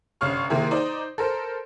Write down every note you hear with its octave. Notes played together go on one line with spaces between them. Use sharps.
G1 C3 C#4 F5 C#6 F6
C3 D#3 A#3 E4 G#4 A#4
D#4 C5 D5
A4 A#4 C5